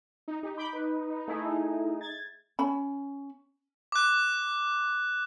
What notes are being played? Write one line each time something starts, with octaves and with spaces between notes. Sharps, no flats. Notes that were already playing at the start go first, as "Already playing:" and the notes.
D#4
D#4 G4
B5 D6 G6
B4
A3 E4 G#4
G#6 A6
C#4 B5
D6 F#6